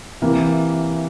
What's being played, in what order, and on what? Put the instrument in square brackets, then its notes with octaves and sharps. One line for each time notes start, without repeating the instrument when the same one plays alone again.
[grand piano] C3 E3 A#3